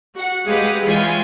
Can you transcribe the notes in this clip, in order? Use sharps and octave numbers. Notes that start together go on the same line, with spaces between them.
F#4 F#5
G#3 G4 G#4 B4 F5 F#5
E3 G#3 F4 C#5 G5 G#5